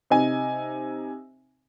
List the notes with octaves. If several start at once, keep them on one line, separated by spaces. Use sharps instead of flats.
C3 D#4 G#5